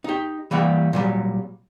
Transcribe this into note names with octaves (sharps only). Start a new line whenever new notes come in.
D#4 G4
E3 G3 A#3 F#5
A#2 F#3 G3